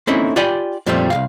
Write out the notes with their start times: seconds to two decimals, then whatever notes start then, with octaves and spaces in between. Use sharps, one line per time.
0.07 A#3 C4 C#4 D#4 E4 A4
0.36 F4 G4 D5 G5 G#5 B5
0.86 F2 A#2 F3 G3 A3 C4
1.10 C2 G#2 F5